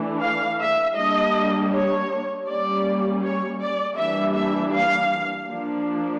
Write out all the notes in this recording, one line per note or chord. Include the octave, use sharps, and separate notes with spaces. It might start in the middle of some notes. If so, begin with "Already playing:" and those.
Already playing: E3 A3 D4
F5
E5
G3 A#3 D4 D#5
C#5
G3 A#3 C#4 D5
C#5
D5
E3 G3 A#3 D4 E5
E5
F5
F3 A#3 D4